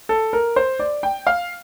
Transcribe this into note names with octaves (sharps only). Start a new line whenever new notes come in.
A4
A#4
C5
D5
G5
F5